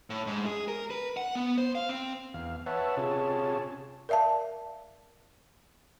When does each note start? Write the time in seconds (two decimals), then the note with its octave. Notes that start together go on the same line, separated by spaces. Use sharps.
0.10 A2
0.27 G#2
0.46 G#4
0.68 A#4
0.90 B4
1.17 F#5
1.35 B3
1.58 C5
1.75 F5
1.89 C4
2.34 E2 F5
2.66 B4 C#5 E5 F#5 A5
2.97 C3 C#4 F4 G#4 C#5 A5
4.09 A#4 D5 E5 F5 A5